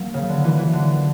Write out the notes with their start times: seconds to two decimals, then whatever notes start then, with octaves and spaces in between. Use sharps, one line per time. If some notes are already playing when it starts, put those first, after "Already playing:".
Already playing: F#3 A#3
0.14 C#3
0.29 D3
0.44 E3
0.59 E3
0.73 D3